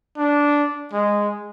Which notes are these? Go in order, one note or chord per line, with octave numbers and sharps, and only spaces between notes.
D4
G#3